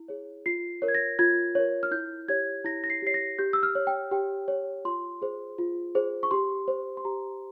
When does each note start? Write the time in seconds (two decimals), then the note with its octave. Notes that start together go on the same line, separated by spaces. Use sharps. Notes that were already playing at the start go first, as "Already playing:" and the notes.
Already playing: E4
0.08 G#4 C#5
0.46 F4 C7
0.82 A#4 C#5
0.88 G#6
0.95 A#6
1.19 F4 G#6
1.55 A#4 C#5
1.83 F6
1.91 E4 G6
2.28 G4 C#5 G#6
2.65 E4 A#6
2.84 A#6
2.90 C7
3.02 G4 C#5 C7
3.14 A#6
3.39 G4 G6
3.53 E6
3.63 F6
3.75 C#5
3.87 G5
4.12 G4 G5
4.48 C#5
4.85 F4 C6
5.22 G#4 C5
5.58 F4
5.95 G#4 C5
6.23 C#6
6.31 G4 C6
6.68 C5
6.97 C6
7.05 G4 A#5